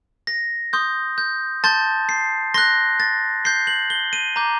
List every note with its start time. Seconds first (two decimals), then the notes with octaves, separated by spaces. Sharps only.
0.27 A#6
0.73 C6 D#6 G6
1.18 G6
1.64 A5 C6 G6 A6
2.09 C7
2.54 C6 F#6 A#6
3.00 A6
3.45 C6 G6 C7
3.67 F#7
3.90 G7
4.13 D#7
4.36 A#5 D6 G6